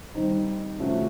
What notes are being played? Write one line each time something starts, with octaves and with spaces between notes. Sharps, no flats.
D#3 G3 C4 D#4
C3 F3 A3 C#4 F#4